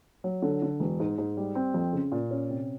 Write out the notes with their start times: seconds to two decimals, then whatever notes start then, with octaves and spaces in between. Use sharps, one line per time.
0.24 F#3
0.42 D3
0.62 D3
0.80 E1
1.00 G#2
1.18 G#2
1.37 G3
1.55 C4
1.74 F2
1.93 C#3
2.12 A#2
2.31 C#4
2.50 C3